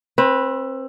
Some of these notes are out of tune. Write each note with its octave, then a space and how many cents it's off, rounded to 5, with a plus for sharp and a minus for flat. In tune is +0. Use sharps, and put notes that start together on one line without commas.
C4 +25 B4 -5